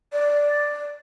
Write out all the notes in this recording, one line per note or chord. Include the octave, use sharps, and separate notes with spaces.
D5